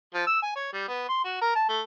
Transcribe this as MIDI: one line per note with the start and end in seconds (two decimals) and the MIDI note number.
0.14 0.24 53
0.27 0.42 88
0.42 0.53 80
0.56 0.71 73
0.73 0.84 55
0.88 1.04 59
1.09 1.23 84
1.24 1.39 66
1.41 1.53 70
1.55 1.65 81
1.69 1.81 57